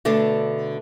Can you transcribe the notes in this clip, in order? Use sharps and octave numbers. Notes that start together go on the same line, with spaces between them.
B2 D3 A3 D4